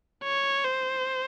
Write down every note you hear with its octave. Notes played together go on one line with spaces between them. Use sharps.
C#5
C5